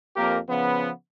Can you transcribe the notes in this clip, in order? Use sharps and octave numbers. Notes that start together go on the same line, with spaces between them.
F2 A#3 G4 A#4
C#3 F3 B3